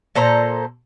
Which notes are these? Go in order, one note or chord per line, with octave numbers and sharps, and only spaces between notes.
A#2 A4 C5 A#5